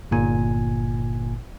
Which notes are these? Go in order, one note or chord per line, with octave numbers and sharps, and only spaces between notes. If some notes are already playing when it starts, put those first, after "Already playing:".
G1 A#2 G#5